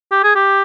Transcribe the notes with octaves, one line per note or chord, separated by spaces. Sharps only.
G4
G#4
G4